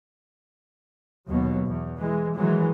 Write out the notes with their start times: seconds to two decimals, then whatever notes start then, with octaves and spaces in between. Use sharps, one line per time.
1.29 D#2 B2 F#3
1.68 E2
1.97 E3 G#3
2.34 D#3 E3 F#3 G#3